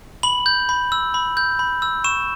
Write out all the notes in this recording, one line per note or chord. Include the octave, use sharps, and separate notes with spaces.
B5 F#7
G6
B5
E6
B5
G6
B5
E6
C#6 E7